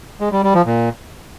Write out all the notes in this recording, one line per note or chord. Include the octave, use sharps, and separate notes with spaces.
G#3
G3
G3
F3
A#2